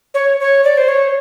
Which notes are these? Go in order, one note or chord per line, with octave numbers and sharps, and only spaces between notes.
C#5
C#5
D5
C5
C#5